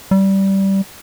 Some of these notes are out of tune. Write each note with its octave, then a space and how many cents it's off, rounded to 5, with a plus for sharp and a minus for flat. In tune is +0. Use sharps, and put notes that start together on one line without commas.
G3 -15